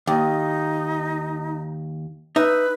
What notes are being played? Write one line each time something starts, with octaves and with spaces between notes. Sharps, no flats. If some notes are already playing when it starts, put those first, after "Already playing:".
D#2 D#4
D#4 B4 E5